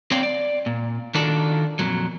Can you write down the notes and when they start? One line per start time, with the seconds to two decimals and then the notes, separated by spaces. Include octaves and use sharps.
0.11 C4 C#5 D5 F5 G5
0.23 D5
0.66 A#2
1.14 D#3 D4 F4 F#4 A4 D5
1.79 F2 A#2 F#3